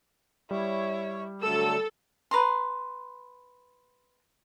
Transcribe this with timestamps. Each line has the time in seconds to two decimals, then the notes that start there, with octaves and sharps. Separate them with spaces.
0.51 G3 E4 C#5
1.43 D3 F#3 A3 A4 E6
2.31 B4 A#5 C6